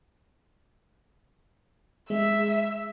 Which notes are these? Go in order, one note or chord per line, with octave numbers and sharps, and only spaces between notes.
G#3 E5